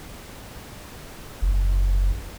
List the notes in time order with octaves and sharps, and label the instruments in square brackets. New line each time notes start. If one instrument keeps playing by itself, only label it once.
[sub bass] F#1